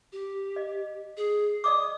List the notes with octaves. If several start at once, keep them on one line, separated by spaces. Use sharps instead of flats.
G4
D#5
G#4
D5 D#5 D6 D#6